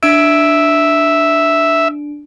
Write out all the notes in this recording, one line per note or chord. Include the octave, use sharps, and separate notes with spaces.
D4 E5 D7